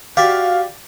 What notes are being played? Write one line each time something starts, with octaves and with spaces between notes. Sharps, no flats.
F#4 G4 D5 E5 F5